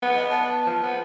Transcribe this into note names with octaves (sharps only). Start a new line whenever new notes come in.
B3
D#5
A5
F3
B3